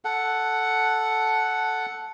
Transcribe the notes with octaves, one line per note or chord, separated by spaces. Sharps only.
A4 F#5